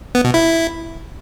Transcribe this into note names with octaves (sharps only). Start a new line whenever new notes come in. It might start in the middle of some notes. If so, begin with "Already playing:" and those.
B3
B2
E4